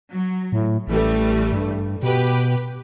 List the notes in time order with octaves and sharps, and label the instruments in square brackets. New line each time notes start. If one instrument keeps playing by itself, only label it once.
[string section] F#3
[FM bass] A2
[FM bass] A1 [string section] E3 G3 A3
[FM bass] G2
[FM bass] B2 [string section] G4 B4